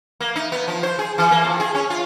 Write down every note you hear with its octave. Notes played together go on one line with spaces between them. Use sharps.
A#3
D#4
B3
F3
C5
G#4
E3
A#3
F2
G#4
C#4
F4